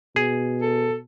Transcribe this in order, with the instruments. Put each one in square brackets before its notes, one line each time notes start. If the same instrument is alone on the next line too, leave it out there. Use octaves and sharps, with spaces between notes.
[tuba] B2 [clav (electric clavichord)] G#4
[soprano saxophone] A4